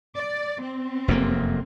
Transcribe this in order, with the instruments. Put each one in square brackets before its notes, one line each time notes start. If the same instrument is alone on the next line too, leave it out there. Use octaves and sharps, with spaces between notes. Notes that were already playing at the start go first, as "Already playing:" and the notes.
[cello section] D5
C4
[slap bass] F1 F#2 A#3